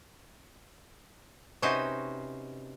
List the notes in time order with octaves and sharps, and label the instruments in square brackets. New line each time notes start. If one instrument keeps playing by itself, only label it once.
[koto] C3 C#4 D#4 F#4 B4 C5